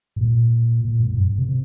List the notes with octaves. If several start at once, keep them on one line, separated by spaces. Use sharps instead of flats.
G#2
A#2
A#2
G#2
G#2
F#2
C3
C3